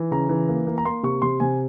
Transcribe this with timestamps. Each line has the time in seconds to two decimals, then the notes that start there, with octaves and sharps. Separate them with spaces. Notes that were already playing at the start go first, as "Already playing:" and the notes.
Already playing: E3
0.11 C#3 A#5
0.29 E3
0.49 A#3
0.67 A#3
0.78 A#5
0.85 A#3 C6
1.03 C3 C#6
1.22 C3 C6
1.40 C3 G#5